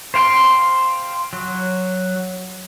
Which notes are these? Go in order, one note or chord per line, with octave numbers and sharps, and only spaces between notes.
C5 F5 G5 C6
F#3